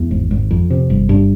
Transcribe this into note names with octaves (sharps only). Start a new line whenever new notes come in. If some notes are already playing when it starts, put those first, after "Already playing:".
Already playing: E2
G#1
G#1
F2
C3
G1
G2